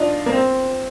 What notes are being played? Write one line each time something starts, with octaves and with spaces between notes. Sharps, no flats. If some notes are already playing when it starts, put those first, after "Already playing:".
Already playing: D4 D#4 F4
A#3
C4